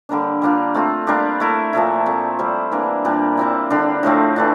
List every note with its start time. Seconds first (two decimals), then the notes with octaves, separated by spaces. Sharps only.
0.09 D3 G3 A#3 D4
0.42 G3 A#3 D4 F4
0.74 A3 C4 F4
1.07 G3 A#3 D4 G4
1.40 A3 E4 A#4
1.73 A#2 F3 A3 E4
2.06 A#2 A3 C4
2.39 G3 C4 G4 C5
2.71 E3 A#3 D4
3.05 A#2 G3 D4
3.37 G3 C4 E4
3.70 D3 G3 D4
4.03 A2 F3 A3 C4
4.36 E3 A3 D4